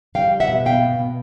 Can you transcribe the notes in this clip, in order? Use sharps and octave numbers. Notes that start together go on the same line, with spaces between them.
G3 F5 G5
G3
E5 F#5
B2
B3 F5 G5
B2
B2